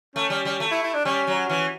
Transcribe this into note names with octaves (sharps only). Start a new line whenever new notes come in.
A3 C#4
G3
G3
A3
E4
E4
D4
G3 C#4
F#3
E3 C#4